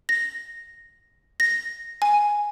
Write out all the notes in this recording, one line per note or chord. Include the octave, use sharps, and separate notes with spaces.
A#6
A#6
G#5